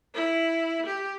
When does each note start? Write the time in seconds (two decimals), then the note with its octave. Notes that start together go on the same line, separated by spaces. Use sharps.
0.14 E4
0.86 G4